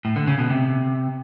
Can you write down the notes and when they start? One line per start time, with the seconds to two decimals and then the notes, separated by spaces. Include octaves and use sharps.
0.05 A2
0.16 D3
0.27 C#3
0.39 B2
0.50 C3